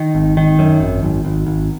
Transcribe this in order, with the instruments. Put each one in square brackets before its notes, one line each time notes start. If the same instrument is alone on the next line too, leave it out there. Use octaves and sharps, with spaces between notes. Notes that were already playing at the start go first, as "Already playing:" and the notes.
Already playing: [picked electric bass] D#3
G#1
D#3
F#2
G#1
G#1
G#1
G#1